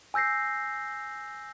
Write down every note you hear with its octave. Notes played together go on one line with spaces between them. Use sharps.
G#5 E6 G6 A#6 C7